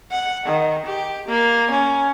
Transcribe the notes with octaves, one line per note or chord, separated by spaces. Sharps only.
F#5
D#3
G4
A#3
C#4